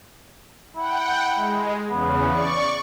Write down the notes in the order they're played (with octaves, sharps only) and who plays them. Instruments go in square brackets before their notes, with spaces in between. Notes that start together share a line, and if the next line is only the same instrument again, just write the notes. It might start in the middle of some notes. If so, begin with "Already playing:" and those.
[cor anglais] E4 [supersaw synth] F#5 G5
[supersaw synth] G#3
[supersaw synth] E2 C#3 [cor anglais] B3
[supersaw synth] D5 C#6